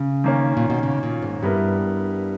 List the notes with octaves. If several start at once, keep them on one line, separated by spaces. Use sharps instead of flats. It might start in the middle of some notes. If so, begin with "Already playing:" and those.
Already playing: C#3
D#3 A#3 C#4
A#2
B2
C#3
A#2
G#2
G2 G3 B3 E4 A#4